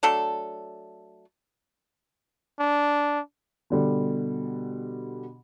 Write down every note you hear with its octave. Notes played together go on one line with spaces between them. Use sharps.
F#3 A3 D4 A4
D4
B2 D3 G3